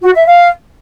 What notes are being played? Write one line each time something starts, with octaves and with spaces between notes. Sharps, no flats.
F#4
E5
F5